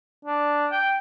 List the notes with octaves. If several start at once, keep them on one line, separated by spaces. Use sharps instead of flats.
D4
G5